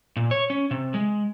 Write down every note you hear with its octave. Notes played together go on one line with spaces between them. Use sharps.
A#2
C#5
C#4
C3
G#3